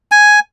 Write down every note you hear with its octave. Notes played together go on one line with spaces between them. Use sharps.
G#5